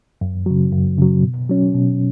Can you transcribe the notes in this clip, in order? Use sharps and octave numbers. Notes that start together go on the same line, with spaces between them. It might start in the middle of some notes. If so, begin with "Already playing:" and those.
F#2
C#3 F#3
F#2
C#3 F#3
B2
F#3 C#4
B2